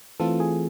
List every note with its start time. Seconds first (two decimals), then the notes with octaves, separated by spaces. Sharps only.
0.20 E3 A3 C4 F4 A4
0.40 G#4